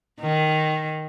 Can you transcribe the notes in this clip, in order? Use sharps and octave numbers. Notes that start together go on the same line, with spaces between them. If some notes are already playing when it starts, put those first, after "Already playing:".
D#3